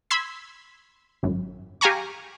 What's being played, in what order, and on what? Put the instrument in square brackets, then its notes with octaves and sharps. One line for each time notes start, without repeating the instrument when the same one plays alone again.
[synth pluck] B5 C6 E6 G#6 B6
G#1 F#2
G4 F5 G#5 A#5 C#6